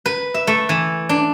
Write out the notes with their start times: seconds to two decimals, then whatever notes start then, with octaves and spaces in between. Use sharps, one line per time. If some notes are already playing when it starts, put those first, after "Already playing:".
0.06 B4
0.34 E5
0.47 A3
0.69 E3
1.09 D4